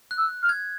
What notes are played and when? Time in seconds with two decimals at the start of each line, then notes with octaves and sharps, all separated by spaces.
0.11 F#6
0.18 E6
0.42 F6
0.49 G#6